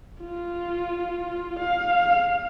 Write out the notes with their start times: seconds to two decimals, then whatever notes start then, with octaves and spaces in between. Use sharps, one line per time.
0.21 F4
1.59 F5